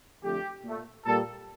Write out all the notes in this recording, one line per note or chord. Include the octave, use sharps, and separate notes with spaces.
F2 D3 A3 G4
A#2 A3
A#2 G3 A#3 A4